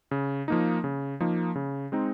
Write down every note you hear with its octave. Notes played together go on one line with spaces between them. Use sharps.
C#3
F3 A#3 D#4
C#3
F3 A#3 D#4
C#3
G#3 C4 D#4